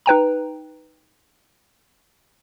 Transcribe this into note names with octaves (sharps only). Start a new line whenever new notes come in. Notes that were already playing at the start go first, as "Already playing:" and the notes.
D#4 B4 G5 A#5